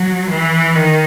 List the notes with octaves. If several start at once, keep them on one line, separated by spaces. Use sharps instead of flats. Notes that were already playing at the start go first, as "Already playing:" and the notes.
Already playing: F#3
E3
D#3